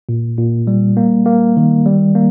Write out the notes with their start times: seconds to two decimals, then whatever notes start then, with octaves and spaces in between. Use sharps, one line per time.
0.09 A#2
0.38 A#2
0.67 G3
0.97 A#3
1.26 A#3
1.57 D#3
1.86 G3
2.15 A#3